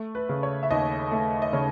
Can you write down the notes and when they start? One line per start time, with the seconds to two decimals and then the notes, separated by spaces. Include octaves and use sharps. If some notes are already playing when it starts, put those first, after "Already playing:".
Already playing: A3
0.15 B4
0.29 C#3
0.43 C#5
0.63 E5
0.70 D#2 D#5
1.12 A3
1.42 D#5
1.53 C#3 C#5